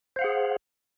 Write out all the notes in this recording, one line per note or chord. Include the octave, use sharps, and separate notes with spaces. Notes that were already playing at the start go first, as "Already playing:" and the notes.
G#4 C5 F5 F#5